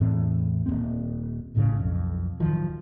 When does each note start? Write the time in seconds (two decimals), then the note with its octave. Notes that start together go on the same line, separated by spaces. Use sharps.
0.01 E2 A2 E3 C4
0.66 D#1 G#1 A#3 C4
1.55 D#1 A1 A2 C#3
1.77 B1 F2
2.40 D1 D#3 F3 F#3